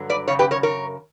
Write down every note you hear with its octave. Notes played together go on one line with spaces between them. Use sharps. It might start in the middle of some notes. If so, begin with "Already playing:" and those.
Already playing: G2 D3 F#3
B4 D5
F#2 C#3 C#5
G4 B4
A#4 C#5
A#4 C#5